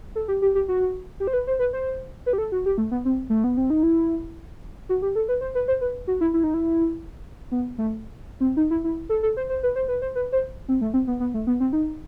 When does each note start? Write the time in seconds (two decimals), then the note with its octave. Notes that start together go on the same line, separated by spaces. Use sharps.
0.15 A4
0.28 G4
0.42 G4
0.55 G4
0.68 F#4
1.20 G4
1.27 C5
1.33 B4
1.47 C5
1.59 B4
1.73 C5
2.26 B4
2.33 G4
2.38 A4
2.52 F#4
2.66 G4
2.78 A3
2.91 B3
3.05 C4
3.30 A3
3.44 B3
3.57 C4
3.70 D#4
3.83 E4
4.89 F#4
5.02 G4
5.15 A4
5.29 B4
5.41 C5
5.55 B4
5.68 C5
5.81 B4
6.07 F#4
6.21 E4
6.34 E4
6.44 D#4
6.54 E4
7.51 B3
7.78 A3
8.40 C4
8.57 D#4
8.71 E4
8.84 E4
9.09 A4
9.23 A4
9.37 C5
9.49 C5
9.63 B4
9.76 C5
9.88 B4
10.02 C5
10.15 B4
10.32 C5
10.68 C4
10.81 A3
10.94 C4
11.07 B3
11.20 B3
11.34 A3
11.47 B3
11.60 C4
11.73 D#4